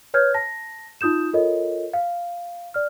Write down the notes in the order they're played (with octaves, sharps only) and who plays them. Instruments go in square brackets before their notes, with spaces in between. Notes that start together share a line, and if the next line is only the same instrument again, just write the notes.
[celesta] B4 C#5 F6 G6 G#6
A5 A#6
D#4 F4 D#6 G6 E7
F4 A4 A#4 C#5 D#5
F5
D5 F6